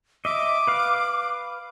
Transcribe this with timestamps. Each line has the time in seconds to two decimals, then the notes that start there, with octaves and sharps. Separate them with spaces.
0.25 D#5 E5 D6
0.67 B4 F5